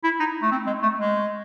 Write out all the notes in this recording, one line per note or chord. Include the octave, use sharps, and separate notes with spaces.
E4
D#4
A3
C4
G#3
A3
G#3